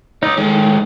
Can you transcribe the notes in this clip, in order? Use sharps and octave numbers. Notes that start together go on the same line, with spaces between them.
D#4 C#5 D#5
A2 D#3 G#3